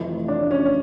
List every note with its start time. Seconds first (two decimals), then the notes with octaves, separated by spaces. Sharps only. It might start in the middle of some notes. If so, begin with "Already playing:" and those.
Already playing: F1 F2 E3 A3
0.28 D4
0.51 C#4